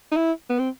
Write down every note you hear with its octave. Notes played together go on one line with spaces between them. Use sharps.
D#4
E4
B3
C4